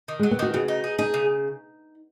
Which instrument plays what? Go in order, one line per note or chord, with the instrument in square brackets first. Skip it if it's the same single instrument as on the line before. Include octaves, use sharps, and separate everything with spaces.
[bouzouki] D#3
[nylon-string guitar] G#3
[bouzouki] F#3
[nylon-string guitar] B3
[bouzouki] D#3 [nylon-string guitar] F#4
[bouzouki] C#3 [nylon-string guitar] F#4
[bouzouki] D#4
G#4
[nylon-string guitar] D#4 [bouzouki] G#4
[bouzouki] C#3